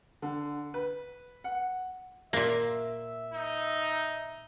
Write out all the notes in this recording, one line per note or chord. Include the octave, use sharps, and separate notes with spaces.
D3
B4
F#5
A#2 A#3 E5
D#4